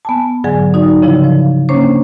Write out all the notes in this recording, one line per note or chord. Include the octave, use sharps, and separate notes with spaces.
B3 G#5 A5
G#2 D3 F#3 G#4 G#5
D#4 F#4 D5
C#3 F3 E4
F3
A#3 C#4 D4 C5 C#5